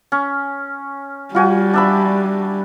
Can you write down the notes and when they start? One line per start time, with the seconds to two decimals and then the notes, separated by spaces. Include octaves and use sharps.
0.12 C#4
1.35 G3 F4 F#4 G#5
1.74 D4 E5 B5